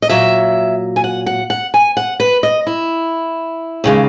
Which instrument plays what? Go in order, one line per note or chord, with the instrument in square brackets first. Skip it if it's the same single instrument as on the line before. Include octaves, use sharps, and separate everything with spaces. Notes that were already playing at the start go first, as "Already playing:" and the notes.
[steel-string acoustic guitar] D#5
A#2 F#3 E5
G#5
F#5
F#5
F#5
G#5
F#5
B4
D#5
E4
D#2 C#3 G#3